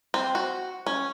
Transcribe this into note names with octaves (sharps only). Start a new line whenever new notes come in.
C4
F#4
C#4